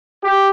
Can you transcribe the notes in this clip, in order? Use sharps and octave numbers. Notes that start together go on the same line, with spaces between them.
G4